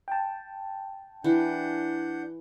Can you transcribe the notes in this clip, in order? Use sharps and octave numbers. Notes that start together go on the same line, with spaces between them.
G5 A5
E3 D4 F#5 G6